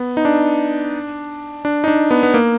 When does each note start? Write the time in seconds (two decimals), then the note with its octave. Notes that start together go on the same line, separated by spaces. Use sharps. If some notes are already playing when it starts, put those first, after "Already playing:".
Already playing: B3
0.17 D#4
0.25 D4
1.65 D4
1.84 D#4
1.88 D4
2.11 B3
2.23 B3
2.34 A#3